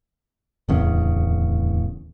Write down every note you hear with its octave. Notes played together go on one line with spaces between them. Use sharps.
D1 E2 C#3